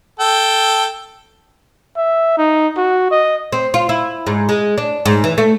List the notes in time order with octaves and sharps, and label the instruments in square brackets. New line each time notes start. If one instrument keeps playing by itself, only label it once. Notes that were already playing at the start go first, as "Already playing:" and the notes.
[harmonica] A4 G5
[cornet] E5
D#4
F#4
D#5
[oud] C4
F4
E4
G#2
G#3
D4
G#2
E3
A3